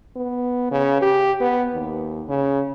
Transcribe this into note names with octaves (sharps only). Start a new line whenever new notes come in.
B3
C#3
G4
B3
D#2
C#3